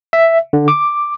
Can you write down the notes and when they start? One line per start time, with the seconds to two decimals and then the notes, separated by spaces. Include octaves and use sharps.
0.13 E5
0.53 D3
0.68 D6